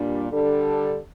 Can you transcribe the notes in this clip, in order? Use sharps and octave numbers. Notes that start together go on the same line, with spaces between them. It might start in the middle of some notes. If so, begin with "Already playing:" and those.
Already playing: A#2 G3 D4
D3 G3 D4 A4